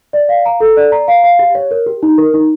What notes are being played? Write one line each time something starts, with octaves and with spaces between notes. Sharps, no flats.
D5
F5
A#5
A4
D5
A#5
F5
F5
G4
C#5
A#4
G4
D#4
A#4
D#4